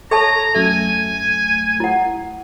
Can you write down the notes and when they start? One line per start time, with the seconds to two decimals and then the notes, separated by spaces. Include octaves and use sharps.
0.11 A4 C#5 E5 A5 A#5
0.55 F#2 A3 G#5
1.80 E4 F#5